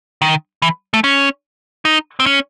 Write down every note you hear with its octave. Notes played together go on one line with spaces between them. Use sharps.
D#3
E3
A3
C#4
D#4
C4
C#4